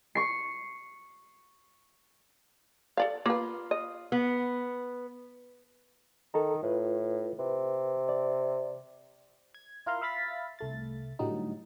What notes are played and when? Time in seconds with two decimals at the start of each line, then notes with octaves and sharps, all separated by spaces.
0.15 C#6 C7
2.97 A4 D5 F5
3.26 A#3 F4 B4
3.71 D#5
4.12 B3
6.34 D#3 A4 A#5
6.63 A2 F4 B4
7.39 C3 B4
8.09 D5
9.54 G#6
9.86 E4 F4 A#4 F5 A#5 C6
10.01 E5 F5 B5 A6 B6
10.59 C2 A3 A6
11.19 A2 D3 F#3 G3 D#4